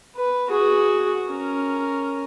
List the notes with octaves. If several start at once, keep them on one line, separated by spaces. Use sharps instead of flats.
B4
F#4 G#4
C#4 A#4